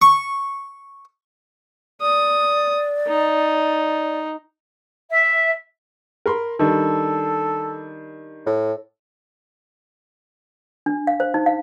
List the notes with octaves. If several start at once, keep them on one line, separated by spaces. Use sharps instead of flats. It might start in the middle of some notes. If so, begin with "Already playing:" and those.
C#6
D5 D#6
D#4
E5
A#4 B5 C6
D#3 G3 D4 A4
A2
D4
F5
C5
D#4
F5